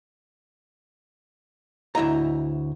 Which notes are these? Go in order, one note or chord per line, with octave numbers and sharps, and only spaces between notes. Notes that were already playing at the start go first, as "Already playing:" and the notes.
D2 E4 D#5 A#5